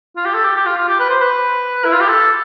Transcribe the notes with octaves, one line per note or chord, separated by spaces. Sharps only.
F4
G4
A4
G4
G4
F4
F4
G4
B4
C5
B4
E4
F4
G4
A4